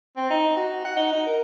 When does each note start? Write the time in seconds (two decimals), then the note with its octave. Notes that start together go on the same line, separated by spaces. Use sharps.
0.17 C4
0.30 D#4
0.56 F#4
0.85 F#5
0.96 D#4
1.13 D#4
1.26 A#4